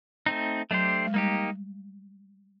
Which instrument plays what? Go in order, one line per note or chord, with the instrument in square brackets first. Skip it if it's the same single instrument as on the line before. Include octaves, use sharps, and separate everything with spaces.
[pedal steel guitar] A3 C4 D#4
[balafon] F#3 [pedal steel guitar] A3 D4 G4 C5
[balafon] G#3
[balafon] G3 [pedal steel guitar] A#3 D#4 G4